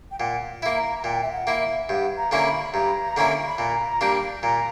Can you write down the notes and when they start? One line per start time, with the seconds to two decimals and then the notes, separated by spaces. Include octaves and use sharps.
0.11 G5
0.19 A#2 F#5
0.62 A#3 E4
0.76 A#5
0.99 A#5
1.04 A#2 G5
1.22 E5
1.32 F#5
1.47 A#3 E4
1.61 E5
1.89 G2 F#5
2.17 A#5
2.31 D3 A#3 C#4 E4 A#5
2.46 B5
2.73 G2 A#5
3.17 D3 A#3 C#4 E4
3.47 B5
3.58 A#2 A#5
4.01 G3 A#3 D4
4.43 A#2 A#5